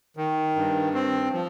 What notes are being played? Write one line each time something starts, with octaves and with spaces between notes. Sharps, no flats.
D#3
G2
C4
F3